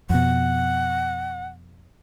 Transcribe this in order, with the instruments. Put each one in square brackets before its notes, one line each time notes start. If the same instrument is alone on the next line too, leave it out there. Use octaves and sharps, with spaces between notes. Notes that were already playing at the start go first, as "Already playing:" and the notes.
[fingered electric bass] F2 B2 [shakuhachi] F#5